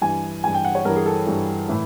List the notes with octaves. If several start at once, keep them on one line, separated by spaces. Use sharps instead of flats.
G2 E3 G#5
G2 E3 G#5
G5
F#5
C#5
G2 E3 A#4
G#4
A4
G2 E3
A2 E3